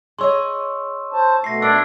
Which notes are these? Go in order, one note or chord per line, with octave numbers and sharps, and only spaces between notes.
G#4 C#5 D#5 C6 C#6 E6
C5 A5
B2 A3 A#6 C7
D4 A#4 E6 G#6